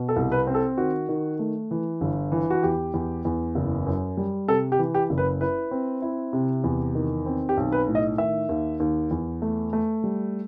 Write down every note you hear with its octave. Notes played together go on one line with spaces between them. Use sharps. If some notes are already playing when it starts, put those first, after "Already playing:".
Already playing: B2
A4
C2
B4
C4
A4
D#3 F#4
D#3
A3
E3
G1
E3
F#4
E2 G4
E2
E2
F#1
F#2
G3
C3 A4
G4
E3
G4
F#1
B4
E4 B4
C4
E4
C3
E2
D#3
C4
G4
B1
B4
A2
D#5
D#3 E5
D#2
D#2
E2
A3
A3
G3